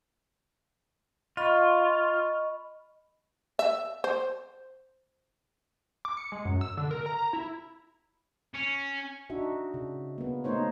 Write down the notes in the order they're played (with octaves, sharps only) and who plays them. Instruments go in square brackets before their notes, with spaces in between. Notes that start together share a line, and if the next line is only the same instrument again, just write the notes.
[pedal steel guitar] F4 [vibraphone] D#5 B5 C#6
[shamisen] E5
C5
[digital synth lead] D6
C#7
G#3
F#2
E6
D3
A#4
A#5
A#5
E4
[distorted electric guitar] C#4
[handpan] D4 D#4 F#4 E5
C#3
A#3 B3
A3 A#3 D#4 C5 C#5